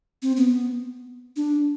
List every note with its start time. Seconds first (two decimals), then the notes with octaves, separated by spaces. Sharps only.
0.23 C4
0.37 B3
1.37 D4